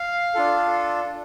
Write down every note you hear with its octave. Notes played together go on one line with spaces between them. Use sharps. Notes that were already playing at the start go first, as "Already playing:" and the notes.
Already playing: F5
D4 F4 A4